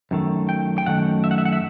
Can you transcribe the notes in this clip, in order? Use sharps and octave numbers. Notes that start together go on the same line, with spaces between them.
F#2 D#3 A3
G5
G5
F#2 D#3 A3 F#5
E5
F#5
E5
F#5
E5